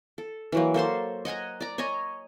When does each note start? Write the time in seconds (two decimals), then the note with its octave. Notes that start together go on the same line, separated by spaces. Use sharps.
0.18 A4
0.52 E3 F#3 A#3
0.74 A#3 A4 C5 C6
1.25 D#5 F#5 G#5 A#5
1.60 D5 A#5
1.78 C#5 D#5 G#5 A#5